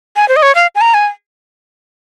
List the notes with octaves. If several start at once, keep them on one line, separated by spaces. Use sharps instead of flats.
G#5
C5
D#5
C#5
F5
G#5
A#5
G#5